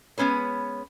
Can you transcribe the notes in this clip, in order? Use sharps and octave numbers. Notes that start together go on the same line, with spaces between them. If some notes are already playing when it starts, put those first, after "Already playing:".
G#3 B3 C#4 B4 C#5